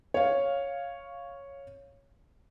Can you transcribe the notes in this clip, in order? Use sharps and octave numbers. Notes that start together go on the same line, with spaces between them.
C#5 F5